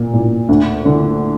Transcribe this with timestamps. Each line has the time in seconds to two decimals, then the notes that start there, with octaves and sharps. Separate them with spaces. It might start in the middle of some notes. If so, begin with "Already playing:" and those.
Already playing: A#2
0.14 A#2
0.49 D2
0.85 D3